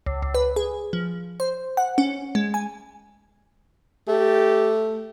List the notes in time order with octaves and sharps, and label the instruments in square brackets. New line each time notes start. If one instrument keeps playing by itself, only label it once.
[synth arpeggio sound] C#2
C#2
B4
G#4
F3
C5
F#5
C#4
G#3
G#5
[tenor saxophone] A3 [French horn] G4